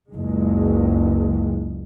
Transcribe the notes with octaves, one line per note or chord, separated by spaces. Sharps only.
F#1 C#2 G#3